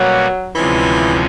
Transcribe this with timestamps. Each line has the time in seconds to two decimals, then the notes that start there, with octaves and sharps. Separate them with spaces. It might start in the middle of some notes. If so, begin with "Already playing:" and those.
Already playing: B2 F#3 G3 A#3 C#4 F#4
0.55 D2 C3 E3 F3 G#3 C#4